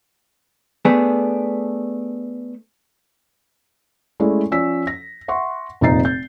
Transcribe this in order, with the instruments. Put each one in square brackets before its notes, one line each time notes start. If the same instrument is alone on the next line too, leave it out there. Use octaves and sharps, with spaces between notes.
[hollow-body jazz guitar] A3 B3 D4 G#4
[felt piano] G#3 A3 C#4 E4 D5
F3 C#4 D5 E6 B6
A#6
E5 F#5 C6 C#6
F1 A#2 C4 D#4 A6 C7
G6